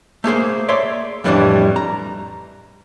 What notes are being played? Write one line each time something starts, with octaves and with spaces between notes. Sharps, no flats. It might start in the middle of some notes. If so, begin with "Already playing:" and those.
A3 A#3 G#4 C5
C#5 D5 E5 C6
F2 A2 E3 G3 C4 D4
A#5